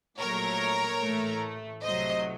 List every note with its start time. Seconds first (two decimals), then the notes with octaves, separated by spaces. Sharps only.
0.19 A#1 A#2 F#3 A3 A#4 C#5
1.01 A1 A2 A3
1.83 C2 C3 F#3 A3 C5 D#5